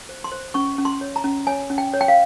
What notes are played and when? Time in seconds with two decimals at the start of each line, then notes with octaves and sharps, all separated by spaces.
0.09 C5
0.24 C6
0.32 C5
0.54 C#4 C#6
0.78 C#4
0.85 C6
1.01 C#5
1.16 A#5
1.24 C#4
1.47 C#5 G#5
1.70 C#4
1.78 G5
1.93 C#5
2.01 G5
2.08 F5